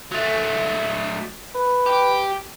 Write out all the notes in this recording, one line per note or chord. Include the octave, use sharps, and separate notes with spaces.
F#3 A3
B4
G4